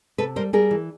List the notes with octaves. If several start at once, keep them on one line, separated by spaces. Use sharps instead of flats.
C3 A4 B4
G3 A#4 C5
G3 G#4 A#4
E3